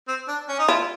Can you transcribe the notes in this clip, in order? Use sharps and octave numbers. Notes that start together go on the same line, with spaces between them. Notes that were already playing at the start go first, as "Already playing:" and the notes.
C4
D4
C#4
D#4
E4 F4